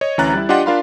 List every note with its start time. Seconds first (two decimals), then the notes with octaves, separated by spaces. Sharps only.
0.01 C#5 D#5
0.18 D2 E3 C#4 A#5 F#6 A6
0.34 G3 E4
0.49 D4 F4 G4 D#5 F#5 C6
0.66 D4 F4 A#4 F5 B5 C6